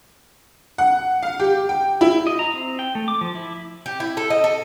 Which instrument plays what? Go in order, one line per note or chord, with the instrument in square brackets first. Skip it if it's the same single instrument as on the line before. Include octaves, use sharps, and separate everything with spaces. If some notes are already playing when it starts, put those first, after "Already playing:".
[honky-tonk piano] F#5
F5
G4
G5
E4
[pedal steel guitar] D#5
A#5
C4
G5
A3
D6
F3
E4
[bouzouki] G4
E4
A4
D#5
A4